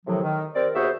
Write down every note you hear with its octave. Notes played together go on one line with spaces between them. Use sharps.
A2 C3 D#3 F3 F#3
D#3
C4 G4 A#4 D5
D#2 B3 F#4 G#4 C5 E5